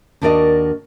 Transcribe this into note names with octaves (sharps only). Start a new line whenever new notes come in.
D#2 D4 F#4 A#4 D5 D#5